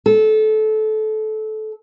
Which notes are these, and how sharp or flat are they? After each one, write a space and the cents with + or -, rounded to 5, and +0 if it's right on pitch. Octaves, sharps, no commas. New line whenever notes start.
A4 -20